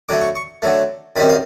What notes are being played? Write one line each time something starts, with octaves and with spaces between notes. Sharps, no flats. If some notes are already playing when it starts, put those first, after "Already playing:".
D3 F#3 A3 D6
C#6
C#6
D3 F#3 A3
F#2 D#3 G3 C4 B5
F5